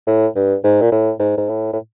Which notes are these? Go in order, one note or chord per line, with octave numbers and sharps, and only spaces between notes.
A2
G2
G#2
A#2
A2
G#2
G#2
A2
A2